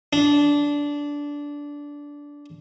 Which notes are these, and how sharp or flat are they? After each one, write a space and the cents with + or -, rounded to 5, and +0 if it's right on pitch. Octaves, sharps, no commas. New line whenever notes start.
D4 -15